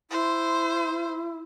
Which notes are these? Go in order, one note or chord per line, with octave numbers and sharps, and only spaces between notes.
E4 C5